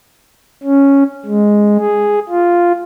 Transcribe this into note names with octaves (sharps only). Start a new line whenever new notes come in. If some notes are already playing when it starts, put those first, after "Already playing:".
C#4
G#3
G#4
F4